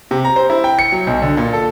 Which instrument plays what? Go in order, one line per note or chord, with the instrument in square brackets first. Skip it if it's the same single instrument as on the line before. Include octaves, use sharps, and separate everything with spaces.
[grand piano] C3
A#5
C5
E4
G5
C#7
F#3
B1
D3
A#2
A4